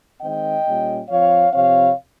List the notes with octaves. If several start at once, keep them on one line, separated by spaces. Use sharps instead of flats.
D#3 G#3 C4 D#5 G5
A#2 G3 C#4
F3 C4 C#5 F5
C3 F3 C4 C#5 F5